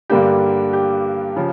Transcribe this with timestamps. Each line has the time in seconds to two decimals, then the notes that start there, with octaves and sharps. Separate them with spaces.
0.10 G2 D3 G3 A#3 D4 G4
0.73 G4
1.36 C#3 F3